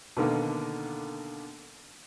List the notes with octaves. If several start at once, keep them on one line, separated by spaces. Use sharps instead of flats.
B2 D3 D#3 A#3